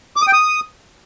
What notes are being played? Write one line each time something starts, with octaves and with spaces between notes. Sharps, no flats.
D6
D#6
G5
D#6